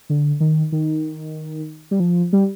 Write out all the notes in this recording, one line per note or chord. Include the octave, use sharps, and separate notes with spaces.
D3
D#3
D#3
G3
F3
G3